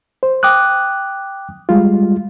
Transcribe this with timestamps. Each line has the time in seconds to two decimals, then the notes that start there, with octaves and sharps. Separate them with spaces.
0.23 C5
0.43 G5 D6 D#6 F#6
1.69 G3 G#3 F4